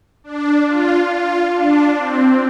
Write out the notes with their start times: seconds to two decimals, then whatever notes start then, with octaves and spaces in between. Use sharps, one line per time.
0.24 D4
0.66 F4
1.10 F4
1.52 D4
1.96 C4